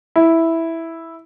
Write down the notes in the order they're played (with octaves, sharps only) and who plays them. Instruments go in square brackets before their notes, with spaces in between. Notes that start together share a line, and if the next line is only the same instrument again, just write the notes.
[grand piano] E4